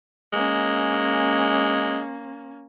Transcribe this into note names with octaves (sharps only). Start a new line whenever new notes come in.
G#3 A#3 C#4